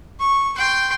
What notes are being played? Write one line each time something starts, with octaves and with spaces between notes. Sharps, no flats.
C#6
G5 C6